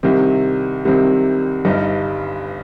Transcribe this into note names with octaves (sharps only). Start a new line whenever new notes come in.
C2 C3 D#3 C4
C2 C3 D#3 C4
G1 G2 G3 D#4